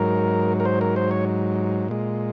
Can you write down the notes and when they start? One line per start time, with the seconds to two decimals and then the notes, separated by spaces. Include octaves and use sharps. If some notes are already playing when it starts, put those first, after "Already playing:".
Already playing: G#2 F#3 A#4
0.60 A#4
0.65 C5
0.81 A#4
0.96 C5
1.11 C#5
1.88 A#2 G#3